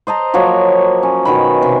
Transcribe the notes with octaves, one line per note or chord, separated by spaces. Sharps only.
C5 D#5 A5 A#5
F3 F#3 A#3 C#5
C#4
B2 D#3 B5
C3